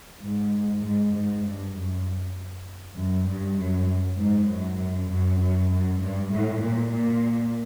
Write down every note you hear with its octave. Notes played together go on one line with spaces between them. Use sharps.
G#2
G#2
G#2
G2
F#2
F#2
G2
F#2
G#2
F#2
F#2
F#2
F#2
G2
A2
A#2
A#2